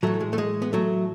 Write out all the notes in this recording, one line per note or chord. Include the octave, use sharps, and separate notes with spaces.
A2 E3 F#3 A3
G#3
A3
G#3
B3
F#3 A3